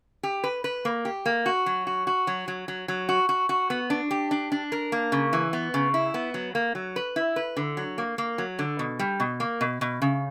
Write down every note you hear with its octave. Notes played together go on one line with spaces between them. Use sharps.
G4
B4
B4
A#3
G4
A#3
F#4
F#3
F#4
F#4
F#3
F#3
F#3
F#3
F#4
F#4
F#4
B3
D4
G4
D4
D4
A#4
A#3
C#3
E3
B3
C#3
E4
B3
F#3
A#3
F#3
B4
E4
B4
D3
F#3
A#3
A#3
F#3
D3
B2
G3
B2
A#3
B2
B2
C#3